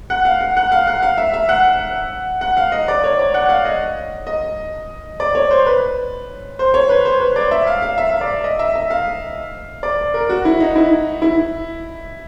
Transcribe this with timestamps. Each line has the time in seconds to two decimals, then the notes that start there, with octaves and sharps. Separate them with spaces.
0.10 F#5
0.25 F5
0.41 F#5
0.57 F#5
0.72 F5
0.87 F#5
1.02 F5
1.18 E5
1.34 E5
1.49 F#5
2.41 F#5
2.57 F5
2.72 D#5
2.88 D5
3.04 C#5
3.19 D5
3.34 F#5
3.49 F5
3.65 D#5
4.27 D#5
5.20 D5
5.35 C#5
5.51 C5
5.66 B4
6.59 C5
6.74 C#5
6.89 B4
7.05 C5
7.20 B4
7.36 D5
7.51 E5
7.67 F5
7.82 F5
7.98 E5
8.09 F5
8.21 D5
8.44 D#5
8.59 E5
8.76 E5
8.90 F5
9.83 D5
10.14 A#4
10.29 F#4
10.45 E4
10.60 D#4
10.76 E4
11.22 E4